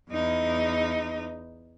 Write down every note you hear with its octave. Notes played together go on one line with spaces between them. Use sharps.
E2 D#4